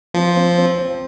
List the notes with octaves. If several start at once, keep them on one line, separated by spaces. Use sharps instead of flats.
F3 C4
C4
C4
C4